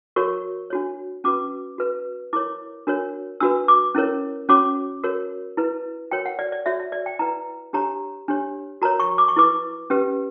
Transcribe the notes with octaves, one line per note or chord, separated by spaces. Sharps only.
F#4 A#4 C#5 C#6
D4 F#4 C#5
C#4 F#4 B4 D6
F#4 B4
E4 A#4 C#5 D6
D4 F#4 A#4 C#5
D4 F#4 B4 E6
D6
C#4 E4 A#4 C#5
C#4 F#4 C#5 D6
F#4 A#4 C#5
E4 B4
F#4 A#4 C#5 G5
F#5
D5
D5
F#4 C#5 E5
E5
D5
G5
E4 B4 A#5
D4 G4 C#5 A#5
D4 G4 C#5
F#4 A#4 C#5 A#5
C#6
D6
C#6
E4 B4 D6
C#4 G4 B4